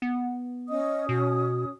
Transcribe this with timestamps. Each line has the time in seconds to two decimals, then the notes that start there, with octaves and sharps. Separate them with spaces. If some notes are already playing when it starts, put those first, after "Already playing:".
0.02 B3
0.69 C#4 D#5 D#6
1.09 B2 F#4